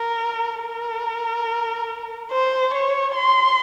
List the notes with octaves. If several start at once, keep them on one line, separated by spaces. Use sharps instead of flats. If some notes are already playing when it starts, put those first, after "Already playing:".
Already playing: A#4
A#4
C5
C#5
C6